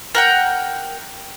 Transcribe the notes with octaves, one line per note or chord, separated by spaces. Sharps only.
A#4 F#5 G5